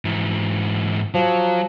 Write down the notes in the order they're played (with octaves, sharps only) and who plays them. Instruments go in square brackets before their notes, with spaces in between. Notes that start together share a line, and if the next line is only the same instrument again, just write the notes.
[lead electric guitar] G#2 E3
[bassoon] F3 [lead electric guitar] F#3